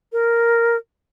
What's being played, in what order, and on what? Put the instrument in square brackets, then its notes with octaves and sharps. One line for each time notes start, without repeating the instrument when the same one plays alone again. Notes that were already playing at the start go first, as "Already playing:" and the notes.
[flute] A#4